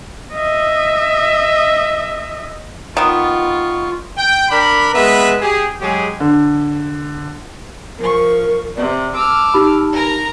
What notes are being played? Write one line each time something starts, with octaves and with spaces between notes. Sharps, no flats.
D#5 E5
D#3 B3 F4 C#6
G5
D4 A#4 B5
G#3 B3 B4 E5
G4 G#4
F#3 G#3 G4 G#4
D3
F3 A#4 C#6
C3 D5
A5 D6 E6 F6
D#4 G4 B5
A#4 A#5